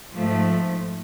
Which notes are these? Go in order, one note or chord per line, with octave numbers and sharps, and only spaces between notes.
G#2 F3 A3